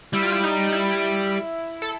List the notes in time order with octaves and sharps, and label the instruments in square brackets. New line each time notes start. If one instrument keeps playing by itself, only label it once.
[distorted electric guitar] G3 [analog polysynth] E4
[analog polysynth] F4
E4
D#4
E4
A4